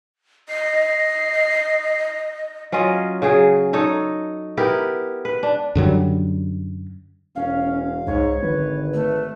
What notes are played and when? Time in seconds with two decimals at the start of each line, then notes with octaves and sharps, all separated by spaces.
0.49 D#5 C7
2.72 F#3 C#4 F4 D#5
3.22 C#3 F#3 G#4
3.73 D#4 A4 C#5 D#5
4.57 B3 E4 G4 A#4
5.25 B4
5.43 D4
5.75 F#2 D3 F#3 G3
7.36 E1 C#4 F5
8.07 C2 G#2 C#5
8.42 G#1 D3 B4
8.94 A3